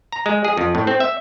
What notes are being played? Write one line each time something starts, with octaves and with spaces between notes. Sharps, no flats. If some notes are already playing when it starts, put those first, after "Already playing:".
A#5
G#3
G#4
F2
A2
C4
E5